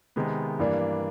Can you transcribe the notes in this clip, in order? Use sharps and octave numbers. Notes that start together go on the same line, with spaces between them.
C3 D#3 G#3 B3
G2 E3 G3 A#3 D4